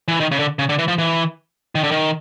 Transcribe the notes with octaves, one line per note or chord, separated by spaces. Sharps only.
E3
D#3
C#3
D3
C#3
D3
E3
F3
E3
D#3
D3
D#3